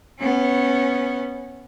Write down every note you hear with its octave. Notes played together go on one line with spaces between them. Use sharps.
B3 C#4